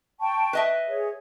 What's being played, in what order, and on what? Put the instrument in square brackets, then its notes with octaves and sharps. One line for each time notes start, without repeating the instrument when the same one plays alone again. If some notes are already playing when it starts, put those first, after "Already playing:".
[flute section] G5 A5 C#6
[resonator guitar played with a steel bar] B4 D#5 E5
[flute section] G#4 C#5